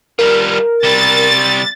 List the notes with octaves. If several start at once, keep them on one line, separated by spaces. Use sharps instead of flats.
G3 F4 A#4
C3 G3 A6